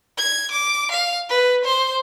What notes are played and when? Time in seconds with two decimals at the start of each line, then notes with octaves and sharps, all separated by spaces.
0.18 G#6
0.52 D6
0.92 F5
1.30 B4
1.65 C5